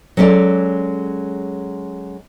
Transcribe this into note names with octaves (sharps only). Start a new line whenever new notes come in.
F#3 G#3 C#4 A4 D5